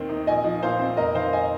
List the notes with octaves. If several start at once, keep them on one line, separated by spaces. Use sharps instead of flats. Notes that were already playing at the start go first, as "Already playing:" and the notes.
Already playing: D#2 D#3 C4
D#4
A#1 D#5 G#5
F3
A#2 C5 F5
C4
F1 A#4 D#5
D#3 C5 F5
D#5 G#5